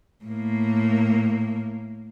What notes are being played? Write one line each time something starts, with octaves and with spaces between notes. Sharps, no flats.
A2 A#3